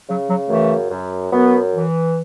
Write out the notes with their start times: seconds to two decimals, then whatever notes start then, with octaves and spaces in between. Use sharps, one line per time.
0.08 C#3 F#3
0.28 F#3
0.49 F#2 E3 A3
0.91 F#2
1.32 F#2 F#3 B3
1.73 E3